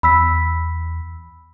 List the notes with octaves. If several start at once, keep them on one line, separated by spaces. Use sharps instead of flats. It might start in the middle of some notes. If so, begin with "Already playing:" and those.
E2 B5 E6 B6